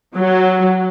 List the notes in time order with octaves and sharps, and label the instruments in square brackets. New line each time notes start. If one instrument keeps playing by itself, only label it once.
[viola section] F#3